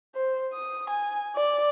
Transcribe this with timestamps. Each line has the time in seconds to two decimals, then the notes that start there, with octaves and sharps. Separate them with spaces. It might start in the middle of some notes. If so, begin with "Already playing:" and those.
0.15 C5
0.53 D#6
0.90 G#5
1.36 D5